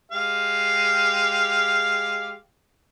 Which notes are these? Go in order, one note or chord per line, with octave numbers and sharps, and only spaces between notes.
G#3 G4 F5